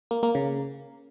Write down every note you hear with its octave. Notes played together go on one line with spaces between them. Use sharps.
A#3
A#3
C#3